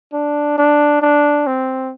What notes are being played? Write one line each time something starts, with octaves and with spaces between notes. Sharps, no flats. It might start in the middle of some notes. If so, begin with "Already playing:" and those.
D4
D4
D4
C4